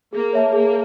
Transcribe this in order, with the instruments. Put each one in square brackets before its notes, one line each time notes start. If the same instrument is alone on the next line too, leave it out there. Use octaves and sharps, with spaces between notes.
[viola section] A#3 [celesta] G#4
[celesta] C#5 E5 A5
[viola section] A#3 [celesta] G#4